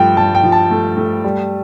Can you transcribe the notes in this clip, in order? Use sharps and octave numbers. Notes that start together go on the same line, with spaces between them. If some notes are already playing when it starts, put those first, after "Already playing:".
Already playing: G2 F3 A3 G5
G2 A5
G5
F3
A5
A3
A3
G3